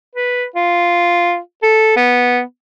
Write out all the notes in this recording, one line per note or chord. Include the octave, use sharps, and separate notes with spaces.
B4
F4
A4
B3